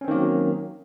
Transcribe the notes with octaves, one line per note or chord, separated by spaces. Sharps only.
D#3 F#3 A#3 C4 C#4